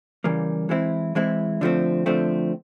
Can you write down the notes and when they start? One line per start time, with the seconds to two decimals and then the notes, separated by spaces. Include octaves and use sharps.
0.24 C#3 E3 G3 A#3
0.69 E3 G#3 C4 E4
1.15 E3 G#3 C4 E4
1.61 D3 F3 A3 C4
2.06 D3 F3 A3 C4